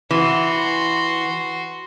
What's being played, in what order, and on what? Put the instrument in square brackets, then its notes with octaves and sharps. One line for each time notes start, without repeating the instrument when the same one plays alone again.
[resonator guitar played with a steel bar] E3 [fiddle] F#4 C6